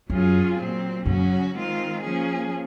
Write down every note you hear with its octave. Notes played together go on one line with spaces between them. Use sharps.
F#2 F#3 C#4 F4 G#4
A#2 F#3 C4
F#2 C#3 F#3 C#4 F#4
D#3 G#3 C4 F4
F3 A#3 C#4 G#4